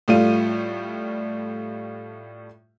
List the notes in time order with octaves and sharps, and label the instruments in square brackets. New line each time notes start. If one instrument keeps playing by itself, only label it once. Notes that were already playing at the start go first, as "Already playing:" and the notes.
[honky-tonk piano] A2 G3 A3 F4 D#7